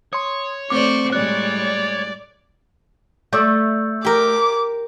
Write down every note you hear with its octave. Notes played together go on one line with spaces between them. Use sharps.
C#5 C6 D#6
A3 C4 C5 D5 C#6 D6
A2 G3 G#3 C#5 D5 F#6
A3 D5 E6 G6
G4 A#4 D6